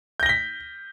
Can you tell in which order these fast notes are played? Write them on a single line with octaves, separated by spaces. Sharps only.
G6 A#6 G7 B6